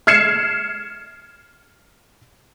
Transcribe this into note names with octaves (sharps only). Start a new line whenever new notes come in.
F6 G#6 C7 C#7 E7